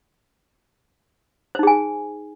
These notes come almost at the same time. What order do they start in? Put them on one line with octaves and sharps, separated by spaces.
C5 D#4 G#4 G#5